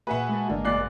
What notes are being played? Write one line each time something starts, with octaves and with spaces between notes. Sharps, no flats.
A#2 A#3 F#4 G#4 B4 E5 F#5
G#3 A#3 A5
G#1 D3 G#3 A#3
F#1 D5 F#6 C7